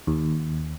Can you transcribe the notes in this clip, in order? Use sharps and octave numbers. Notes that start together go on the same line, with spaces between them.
D#2